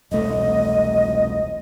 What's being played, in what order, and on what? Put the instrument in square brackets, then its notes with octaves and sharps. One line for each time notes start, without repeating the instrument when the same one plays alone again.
[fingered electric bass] E1 C2 A3 [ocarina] D#5